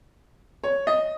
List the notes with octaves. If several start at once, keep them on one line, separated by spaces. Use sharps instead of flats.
C#5
D#5